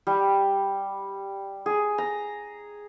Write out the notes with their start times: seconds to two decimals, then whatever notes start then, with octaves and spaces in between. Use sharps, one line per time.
0.07 G3
1.66 G#4
1.98 A#5